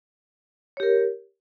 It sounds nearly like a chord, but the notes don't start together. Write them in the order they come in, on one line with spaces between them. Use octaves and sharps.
C#5 G4 A#4